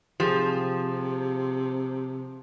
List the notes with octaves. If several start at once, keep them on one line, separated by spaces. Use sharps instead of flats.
C3 F3 G4 G#4